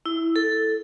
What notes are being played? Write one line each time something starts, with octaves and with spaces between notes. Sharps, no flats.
E4
A4